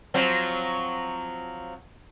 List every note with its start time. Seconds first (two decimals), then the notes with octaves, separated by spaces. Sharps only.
0.14 F3 F#3 C4